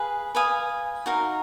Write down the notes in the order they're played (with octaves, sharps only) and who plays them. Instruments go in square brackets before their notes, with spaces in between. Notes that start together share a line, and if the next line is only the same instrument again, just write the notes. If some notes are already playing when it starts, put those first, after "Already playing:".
Already playing: [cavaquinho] G#4 B4 F5
B4 F5 G#5 D#6
D#4 F#4 A#4 F5